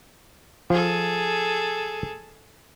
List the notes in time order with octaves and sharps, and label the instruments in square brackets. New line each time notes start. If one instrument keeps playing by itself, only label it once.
[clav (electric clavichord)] F3 [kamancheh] G#4 A4